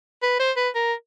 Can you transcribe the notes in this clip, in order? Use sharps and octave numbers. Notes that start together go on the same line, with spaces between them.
B4
C5
B4
A#4